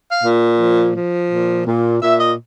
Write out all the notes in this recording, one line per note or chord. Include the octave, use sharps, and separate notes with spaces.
F5
A#2
F3
F3
A#2
A#2
A#2 E5
D#5